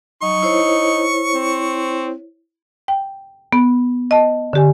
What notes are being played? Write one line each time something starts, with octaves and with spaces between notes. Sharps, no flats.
F#3 D#4 C#6
E4 C5 C#5
C4
G5
B3
D#5 A5
D3 G4 G#5